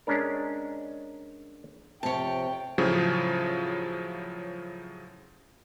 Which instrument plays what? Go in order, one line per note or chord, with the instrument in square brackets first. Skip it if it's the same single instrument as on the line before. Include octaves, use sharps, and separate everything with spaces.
[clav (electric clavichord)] G#3 C#4 D4 A#4
[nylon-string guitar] F2 C3 [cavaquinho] C#5 A5 [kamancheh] G5
[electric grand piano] A2 C#3 F3 F#3